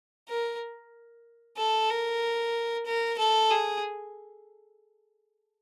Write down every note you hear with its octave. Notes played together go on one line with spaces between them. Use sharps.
A#4
A4
A#4
A#4
A4
G#4